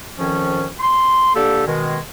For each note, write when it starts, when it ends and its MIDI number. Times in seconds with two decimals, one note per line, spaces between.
0.19 0.65 41
0.19 0.65 51
0.19 0.65 53
0.19 0.65 61
0.80 1.31 84
1.35 1.62 50
1.35 1.62 58
1.35 1.62 67
1.35 1.62 69
1.66 1.97 47
1.66 1.97 51
1.66 1.97 56